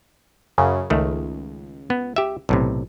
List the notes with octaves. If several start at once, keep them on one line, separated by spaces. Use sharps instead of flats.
F#2 C#3
C#2 D#3 A3
B3
G4 E5
B1 A2 C3